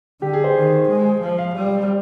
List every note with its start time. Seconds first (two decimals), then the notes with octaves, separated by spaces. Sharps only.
0.22 D3 G4
0.33 G#4
0.44 C5
0.56 D#3
0.89 G#3
1.22 F3
1.39 F5
1.55 G3